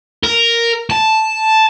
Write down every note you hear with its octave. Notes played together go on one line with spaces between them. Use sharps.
A#4
A5